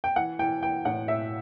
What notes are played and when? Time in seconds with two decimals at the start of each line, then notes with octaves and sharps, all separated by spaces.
0.04 G5
0.16 E3 F#5
0.39 E3 G5
0.62 E3 G5
0.85 A2 F#5
1.08 A2 E5